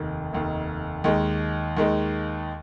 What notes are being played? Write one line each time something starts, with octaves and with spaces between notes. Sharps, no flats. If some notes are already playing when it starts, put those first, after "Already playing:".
Already playing: F1 D#2 D#3
F1 D#2 D#3
D#2 D#3 G#3
D#2 D#3 G#3